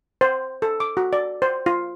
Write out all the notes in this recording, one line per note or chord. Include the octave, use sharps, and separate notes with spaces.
C5
A4
D6
F#4
D5
C5
F4